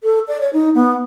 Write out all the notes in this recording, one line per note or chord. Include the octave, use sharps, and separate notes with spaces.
A4
D5
C#5
D#4
B3